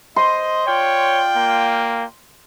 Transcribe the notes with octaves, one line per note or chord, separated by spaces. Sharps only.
C5 D#5 C6
F4 C#5 D5 G5
A#3